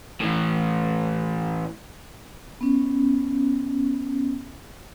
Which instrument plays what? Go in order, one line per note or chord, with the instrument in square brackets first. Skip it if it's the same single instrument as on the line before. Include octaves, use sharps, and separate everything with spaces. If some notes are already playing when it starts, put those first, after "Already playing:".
[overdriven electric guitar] A2 E3
[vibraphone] B3 C#4